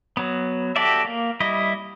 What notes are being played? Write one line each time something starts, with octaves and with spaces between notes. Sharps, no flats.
F#3 B3
F#4 G4 A4 D5 E5
A#3
G3 E4 D#5